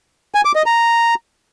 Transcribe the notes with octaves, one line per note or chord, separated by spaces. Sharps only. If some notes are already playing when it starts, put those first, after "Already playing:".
G#5
D6
D#5
A#5